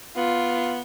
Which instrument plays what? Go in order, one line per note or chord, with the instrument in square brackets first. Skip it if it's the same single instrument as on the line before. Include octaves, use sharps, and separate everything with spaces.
[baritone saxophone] B3 [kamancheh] F4